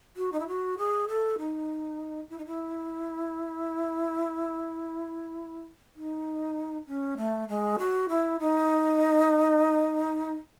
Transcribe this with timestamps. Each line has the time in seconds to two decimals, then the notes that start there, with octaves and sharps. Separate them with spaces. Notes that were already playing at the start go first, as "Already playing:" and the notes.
0.17 F#4
0.32 D#4
0.40 E4
0.48 F#4
0.78 G#4
1.08 A4
1.38 D#4
2.30 E4
2.38 D#4
2.46 E4
5.95 D#4
6.87 C#4
7.17 A3
7.49 G#3
7.79 F#4
8.09 E4
8.40 D#4